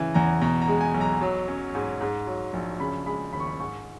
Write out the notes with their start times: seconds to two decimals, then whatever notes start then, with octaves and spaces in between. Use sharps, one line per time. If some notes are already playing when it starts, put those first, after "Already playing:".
Already playing: C#3 E3
0.14 E2 A#5
0.42 B2 A#5
0.61 A#5
0.68 G#3
0.81 G#5
0.94 B1
1.01 A#5
1.21 F#3
1.48 C#4
1.75 G#2
2.01 G#2
2.27 F#3
2.53 A#1
2.80 C#3 B5
3.06 G#3 B5
3.33 D#2 B5
3.40 C#6
3.47 B5
3.59 G#2 C#6